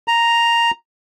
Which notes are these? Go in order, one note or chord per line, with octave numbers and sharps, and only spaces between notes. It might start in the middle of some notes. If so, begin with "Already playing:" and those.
A#5